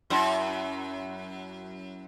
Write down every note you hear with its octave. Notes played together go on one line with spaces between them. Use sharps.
F#2 E4